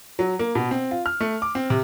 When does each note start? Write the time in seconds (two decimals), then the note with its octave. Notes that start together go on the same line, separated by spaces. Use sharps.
0.19 F#3
0.39 A#3
0.55 B2
0.71 C4
0.91 F4
1.06 F6
1.20 A3
1.42 D6
1.55 C4
1.70 C3